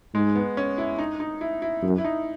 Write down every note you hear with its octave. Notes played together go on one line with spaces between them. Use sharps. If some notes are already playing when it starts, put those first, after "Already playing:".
G#2 G#3
B3
C#4
E4
D#4
D#4
E4
E4
F#2
E4
D#4